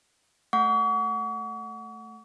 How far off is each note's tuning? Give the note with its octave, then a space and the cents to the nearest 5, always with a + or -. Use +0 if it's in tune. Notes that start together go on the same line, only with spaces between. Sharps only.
A3 +0 F#5 -10 C#6 +45